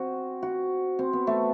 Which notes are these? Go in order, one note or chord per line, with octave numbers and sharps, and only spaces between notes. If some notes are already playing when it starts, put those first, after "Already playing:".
Already playing: C4 F#4
F#4
C4
B3
A3